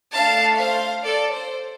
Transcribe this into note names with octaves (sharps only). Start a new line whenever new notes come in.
A3 D4 A4 F5 A5
C5 F5
A4 D5
C5